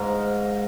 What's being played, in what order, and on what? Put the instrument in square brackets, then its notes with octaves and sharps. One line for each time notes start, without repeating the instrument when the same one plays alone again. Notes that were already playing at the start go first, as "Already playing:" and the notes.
Already playing: [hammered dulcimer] G#2 A#4 F5